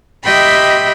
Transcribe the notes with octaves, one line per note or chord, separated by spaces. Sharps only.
G4 D#5 E5 G5 B5 C6